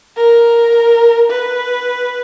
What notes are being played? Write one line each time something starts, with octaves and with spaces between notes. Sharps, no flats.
A#4
B4